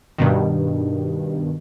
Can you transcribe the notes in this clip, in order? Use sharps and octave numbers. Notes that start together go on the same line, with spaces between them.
G2 B2 D#3